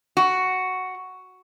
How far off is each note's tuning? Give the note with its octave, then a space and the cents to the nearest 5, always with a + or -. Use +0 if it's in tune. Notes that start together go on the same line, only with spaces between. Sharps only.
F#4 +5